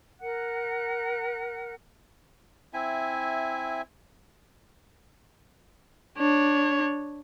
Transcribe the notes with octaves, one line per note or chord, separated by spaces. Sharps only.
A#4 F#5 F#6
C4 E4 E5 G#5
D4 C#5